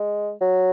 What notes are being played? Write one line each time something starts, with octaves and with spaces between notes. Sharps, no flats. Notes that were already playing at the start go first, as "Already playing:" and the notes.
Already playing: G#3
F#3